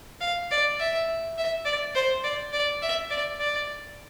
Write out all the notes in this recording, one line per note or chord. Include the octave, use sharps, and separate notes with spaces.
F5
D5
E5
E5
D5
C5
D5
D5
E5
D5
D5